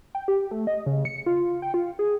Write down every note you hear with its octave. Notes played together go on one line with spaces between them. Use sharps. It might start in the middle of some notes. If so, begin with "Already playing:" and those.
G5
G4
A3
D#5
C#3
C#7
F4
G5
F4
G#4